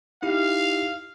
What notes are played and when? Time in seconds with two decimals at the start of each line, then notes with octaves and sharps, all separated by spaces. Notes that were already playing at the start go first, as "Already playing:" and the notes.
0.23 D#4 E4 G4 F5